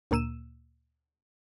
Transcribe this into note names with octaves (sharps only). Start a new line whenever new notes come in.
D2 A#2 A#3 E6 D#7 E7